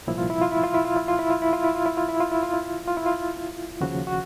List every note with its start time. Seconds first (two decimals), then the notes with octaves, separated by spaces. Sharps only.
0.07 C2 A#2 F3 E4
0.18 F4
0.30 E4
0.41 F4
0.52 E4
0.63 F4
0.74 E4
0.85 F4
0.96 E4
1.08 F4
1.19 E4
1.30 F4
1.42 E4
1.53 F4
1.64 E4
1.75 F4
1.86 E4
1.97 F4
2.09 E4
2.20 F4
2.32 E4
2.43 F4
2.54 E4
2.88 F4
2.97 E4
3.06 F4
3.81 D#2 C#3 F3 F#4
4.07 F#4